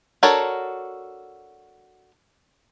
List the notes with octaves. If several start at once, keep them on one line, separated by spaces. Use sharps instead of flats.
D4 F#4 A4 A#4 C#5